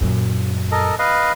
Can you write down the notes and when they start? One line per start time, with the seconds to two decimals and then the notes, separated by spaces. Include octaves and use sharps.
0.01 F#2 A#2
0.72 A4 A#4 D#5
0.99 B4 D#5 F5